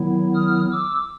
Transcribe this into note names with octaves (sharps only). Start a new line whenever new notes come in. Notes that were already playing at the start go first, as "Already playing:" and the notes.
Already playing: D#3 F#3 B3 E4
D#6 F6
D6 E6